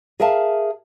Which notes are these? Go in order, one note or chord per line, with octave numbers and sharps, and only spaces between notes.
G#4 A#4 E5 F5 A5